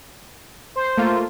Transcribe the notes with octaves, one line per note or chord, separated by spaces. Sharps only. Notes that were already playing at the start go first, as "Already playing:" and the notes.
C5
A3 A#3 F4